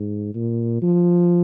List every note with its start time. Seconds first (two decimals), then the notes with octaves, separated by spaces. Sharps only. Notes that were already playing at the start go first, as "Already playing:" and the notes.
Already playing: G#2
0.34 A#2
0.82 F3